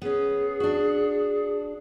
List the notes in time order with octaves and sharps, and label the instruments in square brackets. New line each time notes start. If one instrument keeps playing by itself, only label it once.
[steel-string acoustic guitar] B3 C#4 [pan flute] G#4
[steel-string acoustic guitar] D4 F#4